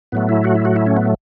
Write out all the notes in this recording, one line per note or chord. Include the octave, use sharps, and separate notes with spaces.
A2 F#3 A3 B3
E4
F#4
E4
F#4
E4
C#4
B3